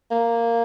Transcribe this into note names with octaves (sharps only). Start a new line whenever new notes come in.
A#3